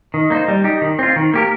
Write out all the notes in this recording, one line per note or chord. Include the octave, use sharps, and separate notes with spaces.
D#3
A#3 D#4 C5
G3
D#4 G4
D#3
C4 F4
D#3
A#3 G4 A#4